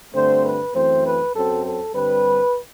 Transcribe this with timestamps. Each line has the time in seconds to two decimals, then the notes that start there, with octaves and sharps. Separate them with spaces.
0.14 G2 D3 A3 C4 C5
0.45 B4
0.74 F#2 E3 A3 C4 C5
1.05 B4
1.34 F#2 F#3 C4 A4
1.65 A4
1.94 G2 D3 G3 C4 B4